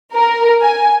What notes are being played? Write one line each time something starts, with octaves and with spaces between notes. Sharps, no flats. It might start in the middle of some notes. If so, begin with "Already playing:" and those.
A#4
G#5